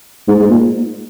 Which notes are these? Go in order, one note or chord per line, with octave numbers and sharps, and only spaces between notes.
G#2
G#2
A#2